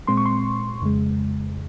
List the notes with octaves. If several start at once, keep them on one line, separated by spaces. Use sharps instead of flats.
A#2 G#3 C4 C6
C#6
C6
F2 C#3 G#3